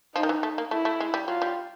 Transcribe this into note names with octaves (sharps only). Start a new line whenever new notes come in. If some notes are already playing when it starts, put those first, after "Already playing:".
F3 D#4
D#3
E3
A3
A#3
A3 E4
A3
G#3
G3
F#3 F4
G3